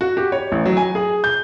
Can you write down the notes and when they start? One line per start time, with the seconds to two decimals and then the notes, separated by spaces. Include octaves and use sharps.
0.01 F#4
0.17 G4
0.32 C#5
0.52 A1
0.66 F#3
0.77 G#5
0.95 G#4
1.24 G6